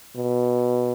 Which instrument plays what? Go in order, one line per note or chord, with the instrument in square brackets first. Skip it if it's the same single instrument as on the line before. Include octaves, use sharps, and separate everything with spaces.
[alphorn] B2